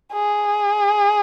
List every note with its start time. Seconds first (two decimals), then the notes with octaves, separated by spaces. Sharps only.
0.12 G#4